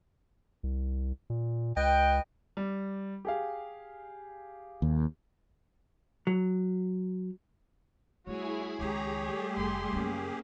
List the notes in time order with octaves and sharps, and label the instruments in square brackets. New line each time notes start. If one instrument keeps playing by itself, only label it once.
[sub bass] C2
A#2
[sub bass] C#2 [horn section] B4 D#5 G5
[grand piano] G3
G4 G#4 F5
[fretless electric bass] D#2
[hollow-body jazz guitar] F#3
[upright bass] G3 A3 [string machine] E4 G#4 G#5 [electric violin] F#4 C#5
[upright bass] C#2 D#3 [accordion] G4 G#4 [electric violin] C#5 [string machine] A#5
[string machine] G3 A3
[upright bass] F1 [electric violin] C6
[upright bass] F#2 C#3 [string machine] A#3 [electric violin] C#4